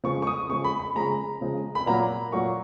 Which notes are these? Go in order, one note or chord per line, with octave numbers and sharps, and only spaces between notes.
C#3 F3 G#3 C#6
C#6
D#6
C#3 F3 G#3 C#6
B5
B5
C#3 F3 G#3 A#5
C#3 F3 G#3
B5
A#2 F#3 A#3 A#5
A#2 F#3 A#3 C#6